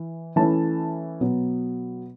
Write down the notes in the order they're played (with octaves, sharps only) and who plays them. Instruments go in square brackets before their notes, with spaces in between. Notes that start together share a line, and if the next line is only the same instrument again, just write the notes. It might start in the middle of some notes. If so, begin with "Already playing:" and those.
Already playing: [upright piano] E3
E3 A3 C#4 E4 A5
B2 F#3 B3